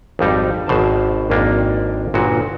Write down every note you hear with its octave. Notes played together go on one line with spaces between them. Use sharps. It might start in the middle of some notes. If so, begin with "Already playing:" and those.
G#1 F2 G3 D#4
G#1 B2 C5 A5
G#1 F2 A#3 D4
G1 A#2 F#4